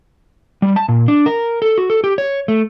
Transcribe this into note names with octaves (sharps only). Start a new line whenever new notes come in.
G3
A5
A#2
D4
A#4
A4
F#4
A4
G4
C#5
A3